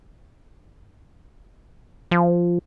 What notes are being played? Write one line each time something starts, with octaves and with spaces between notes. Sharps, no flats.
F3